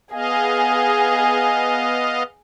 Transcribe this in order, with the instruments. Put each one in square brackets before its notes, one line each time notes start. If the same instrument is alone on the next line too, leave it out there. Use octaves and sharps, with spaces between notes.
[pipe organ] B3 D#5 F5 [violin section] G#4